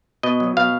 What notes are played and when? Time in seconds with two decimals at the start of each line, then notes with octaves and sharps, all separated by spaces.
0.23 B2 D#5
0.40 F#3
0.57 B2 F5